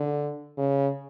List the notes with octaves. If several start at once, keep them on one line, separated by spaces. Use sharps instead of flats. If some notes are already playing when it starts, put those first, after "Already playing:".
Already playing: D3
C#3